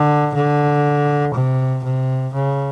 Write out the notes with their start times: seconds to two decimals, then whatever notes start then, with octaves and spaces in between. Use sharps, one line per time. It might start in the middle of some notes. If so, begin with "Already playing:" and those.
Already playing: D3
0.35 D3
1.34 C3
1.84 C3
2.34 C#3